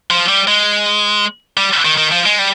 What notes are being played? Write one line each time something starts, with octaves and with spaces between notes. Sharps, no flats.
F3
G3
G#3
G3
D#3
D#3
F3
G#3
G3